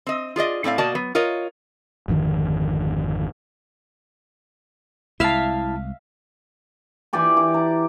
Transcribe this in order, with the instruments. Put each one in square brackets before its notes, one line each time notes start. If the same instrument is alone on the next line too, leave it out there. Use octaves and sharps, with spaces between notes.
[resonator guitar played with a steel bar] C4 D#5
F4 G#4 D5 D#5
A2 C4 D5 F5
B2 A#3 F#4 D5 D#5 A5
F#3 B3
F4 A#4 C#5 D#5
[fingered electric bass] G#1 F2 D3 D#3
[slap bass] C2 G#3 [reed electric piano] E4 A5 [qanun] E5 F5
[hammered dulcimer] E3 G4 D5 G#5
D6
A#5